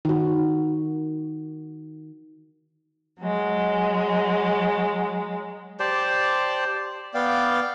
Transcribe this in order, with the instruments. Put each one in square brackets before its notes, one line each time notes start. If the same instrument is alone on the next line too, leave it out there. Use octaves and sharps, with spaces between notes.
[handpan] D#3 F#4
[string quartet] F#3 G#3
[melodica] G4 C5 D5 A5
[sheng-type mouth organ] B3 D5 F5 G5